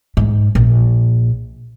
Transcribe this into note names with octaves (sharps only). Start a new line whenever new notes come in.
G#2
A#1